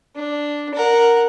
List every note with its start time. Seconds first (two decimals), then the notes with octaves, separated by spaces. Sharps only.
0.16 D4
0.75 A#4 F#5